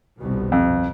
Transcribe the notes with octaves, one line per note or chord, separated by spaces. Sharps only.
G1 C2 B2
F2